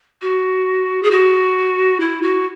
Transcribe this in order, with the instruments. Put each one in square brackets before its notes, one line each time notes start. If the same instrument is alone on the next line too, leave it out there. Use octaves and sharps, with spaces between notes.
[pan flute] F#4
G#4
F#4
E4
F#4